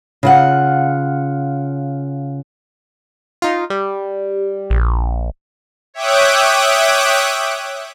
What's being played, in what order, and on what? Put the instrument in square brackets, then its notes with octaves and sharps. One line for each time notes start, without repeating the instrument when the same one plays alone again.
[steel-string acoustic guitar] C#3 F4 F#5
[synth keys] D#4 F4
G3
[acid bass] A#1
[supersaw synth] C#5 E5 G5 D6 D#6 F#6